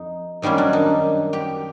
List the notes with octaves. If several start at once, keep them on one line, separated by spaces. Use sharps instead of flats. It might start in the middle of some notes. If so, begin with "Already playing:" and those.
Already playing: F2 D#4
F#2 D#3 G3 A#3 C#4 D#4
D4
D#4
G4